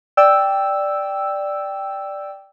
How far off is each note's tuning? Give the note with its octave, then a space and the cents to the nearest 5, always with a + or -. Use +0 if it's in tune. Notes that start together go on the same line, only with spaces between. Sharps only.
D5 +0 G5 +0 E6 +0